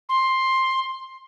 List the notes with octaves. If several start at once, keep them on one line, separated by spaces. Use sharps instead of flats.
C6